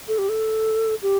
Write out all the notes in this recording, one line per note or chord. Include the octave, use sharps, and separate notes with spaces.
A4
G4
A4
G4